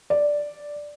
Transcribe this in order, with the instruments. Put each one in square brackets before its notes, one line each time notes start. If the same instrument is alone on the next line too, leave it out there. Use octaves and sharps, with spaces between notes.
[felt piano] D5